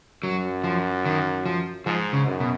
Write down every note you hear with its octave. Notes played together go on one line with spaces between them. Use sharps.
F#2 F#3
F3
D#3
F3
G#2 F3
C#3
F#2
B2